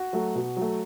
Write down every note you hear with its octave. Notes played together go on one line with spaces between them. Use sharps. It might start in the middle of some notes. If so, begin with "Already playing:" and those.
Already playing: F#4
F#3 A3
B2
F#3 A3